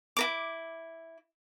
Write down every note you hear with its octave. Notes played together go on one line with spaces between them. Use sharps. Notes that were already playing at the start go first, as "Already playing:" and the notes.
E4 A#4 D6